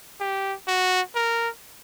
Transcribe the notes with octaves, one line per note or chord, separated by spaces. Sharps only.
G4
F#4
A#4